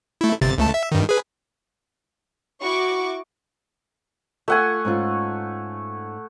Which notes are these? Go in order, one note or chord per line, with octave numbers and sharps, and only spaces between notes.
A3 E4
G1 C3 A6
C#2 A3 A5
E5
G2 D#3
G#4 B4
E4 F#4 C#6 D6
A3 F4 F#5 G#5
G#2 C#4 F4